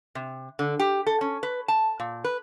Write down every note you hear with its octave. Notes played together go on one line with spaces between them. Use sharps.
C3
D3
G4
A4
C#4
B4
A5
A#2
B4